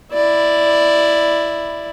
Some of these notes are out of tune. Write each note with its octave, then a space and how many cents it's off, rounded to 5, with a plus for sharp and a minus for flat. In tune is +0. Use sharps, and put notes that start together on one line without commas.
E4 +5 D5 +5